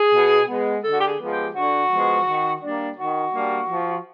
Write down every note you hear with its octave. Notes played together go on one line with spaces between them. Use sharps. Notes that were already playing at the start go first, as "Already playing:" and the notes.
Already playing: G#4
B2
G#3 B3
D3 A4
F#4
G4
G#4
F3 G#3 B3
G4
D3 F#4
F3 G#3 B3
D#3
G3 A#3 D4
D#3 F#4
G3 A#3 D4
F3